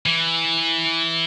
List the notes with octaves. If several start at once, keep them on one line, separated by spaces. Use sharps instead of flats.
E3